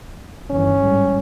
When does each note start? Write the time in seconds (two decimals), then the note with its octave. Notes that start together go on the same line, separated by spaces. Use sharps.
0.50 G1 D#3 E3 C#4
0.81 A1 G#2 G3